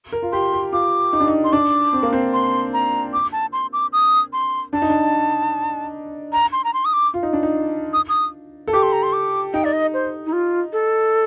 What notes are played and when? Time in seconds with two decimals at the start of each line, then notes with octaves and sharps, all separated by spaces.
0.12 A#4
0.22 F4
0.32 G4 C6
0.53 G4
0.72 F4 D6
1.13 D#4
1.20 D4
1.27 D#4
1.44 C6
1.53 D4 D6
1.93 C4
2.03 A#3
2.13 C4
2.33 C6
2.73 A#5
3.13 D6
3.32 A5
3.53 C6
3.73 D6
3.93 D#6
4.33 C6
4.73 D4 A5
4.82 D#4
4.89 D4
6.32 A#5
6.53 C6
6.64 A#5
6.74 C6
6.85 D#6
6.93 D6
7.14 F4
7.23 D#4
7.33 D4
7.43 D#4
7.93 D#6
8.09 D#6
8.67 A4
8.73 G4 D6
8.83 C6
8.93 A#5
9.03 C6
9.13 D6
9.53 D#4 G5
9.64 D5
9.73 D#5
9.94 C5
10.26 D#4
10.33 F4
10.73 A4